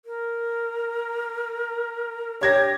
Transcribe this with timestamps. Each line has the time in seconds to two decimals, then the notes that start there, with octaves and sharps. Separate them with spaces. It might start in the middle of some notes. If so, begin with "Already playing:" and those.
0.05 A#4
2.41 D4 G4 C#5 G#6 A#6